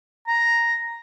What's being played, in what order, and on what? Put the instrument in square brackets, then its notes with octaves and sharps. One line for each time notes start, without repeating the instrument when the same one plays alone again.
[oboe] A#5